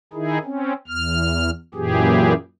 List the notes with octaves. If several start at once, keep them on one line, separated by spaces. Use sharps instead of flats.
D#3 D#4 E4 G#4
C4 C#4
E2 F6
F#2 A#2 E3 G4 G#4